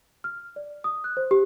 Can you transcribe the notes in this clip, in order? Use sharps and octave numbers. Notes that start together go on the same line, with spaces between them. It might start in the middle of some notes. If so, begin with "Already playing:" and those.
F6
D5
D#6
F#6
C5
G4